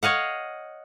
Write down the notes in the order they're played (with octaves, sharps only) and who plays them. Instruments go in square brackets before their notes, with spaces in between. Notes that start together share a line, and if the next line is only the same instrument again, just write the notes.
[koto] C#5 D#5 F5 F#5